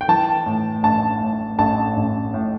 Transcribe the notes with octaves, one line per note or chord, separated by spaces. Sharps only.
G5
E3 A5
A2
A1 A5
A2
A1 A5
A1
A2